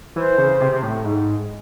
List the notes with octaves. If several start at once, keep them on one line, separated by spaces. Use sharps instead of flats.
E3 C5
C#3
C3
C3
A2
G#2